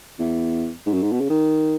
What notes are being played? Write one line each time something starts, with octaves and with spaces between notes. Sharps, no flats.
E2
G#2
F#2
G#2
B2
C#3
D#3